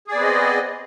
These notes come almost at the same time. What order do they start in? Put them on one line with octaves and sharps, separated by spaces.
G#4 D5 B3 C4 D#5